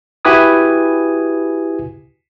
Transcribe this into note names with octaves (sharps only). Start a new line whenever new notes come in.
E4 F#4 G4 B4 G#5 D#6